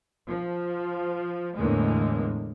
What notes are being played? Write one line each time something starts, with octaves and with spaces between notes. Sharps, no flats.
F3
E2 A2 D3 G#3 A#3